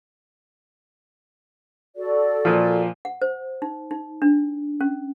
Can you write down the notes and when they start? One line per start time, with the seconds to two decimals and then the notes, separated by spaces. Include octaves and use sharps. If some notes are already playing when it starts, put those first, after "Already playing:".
1.97 F#4 A4 D5
2.45 A#2 F3
3.05 F#5
3.22 C5
3.62 D#4
3.91 D#4
4.22 D4
4.81 C#4